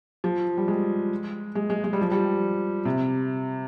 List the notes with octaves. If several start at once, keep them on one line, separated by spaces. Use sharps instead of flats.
F3
G3
G#3
G#3
G#3
G#3
G3
F3
G3
C3